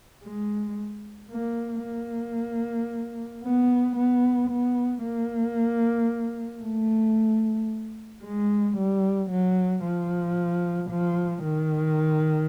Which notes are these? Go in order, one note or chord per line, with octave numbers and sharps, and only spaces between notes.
G#3
A#3
A#3
B3
B3
B3
A#3
A3
G#3
G3
F#3
F3
F3
D#3